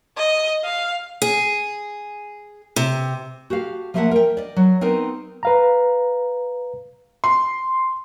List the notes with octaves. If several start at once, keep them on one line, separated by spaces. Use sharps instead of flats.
D#5
F5
G#4
C3
F#4 G4 A4 F5
F3 A3 A#3 B4 E5 F#5
A#4 G5
D5 D#5
F#3
B3 C4 D#4 A#4
B4 F5 A#5
C6